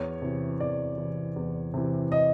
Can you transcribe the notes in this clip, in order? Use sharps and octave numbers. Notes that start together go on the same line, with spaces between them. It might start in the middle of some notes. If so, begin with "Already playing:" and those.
Already playing: E2 C#5
C3 E3
E2 D5
C3 E3
E2
C3 E3
D#5